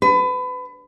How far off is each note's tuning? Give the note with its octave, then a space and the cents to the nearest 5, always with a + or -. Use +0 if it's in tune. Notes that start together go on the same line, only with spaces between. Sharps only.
B4 +30